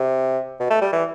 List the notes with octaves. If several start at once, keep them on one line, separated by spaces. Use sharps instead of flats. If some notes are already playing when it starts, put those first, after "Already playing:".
Already playing: C3
B2
A3
G3
E3